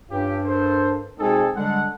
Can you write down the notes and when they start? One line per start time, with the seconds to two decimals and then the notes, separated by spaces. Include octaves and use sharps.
0.10 G2 C#4 F4 G4
0.44 A4 A#4 C5
1.19 B2 G#3 C4 D#4 G#4 A4
1.56 D3 G3 G#3 D4 A4 F#5